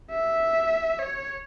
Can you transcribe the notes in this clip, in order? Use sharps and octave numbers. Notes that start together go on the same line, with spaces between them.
E5
C#5